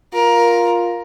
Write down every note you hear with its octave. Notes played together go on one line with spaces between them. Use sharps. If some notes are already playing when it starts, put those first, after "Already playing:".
F4 A#4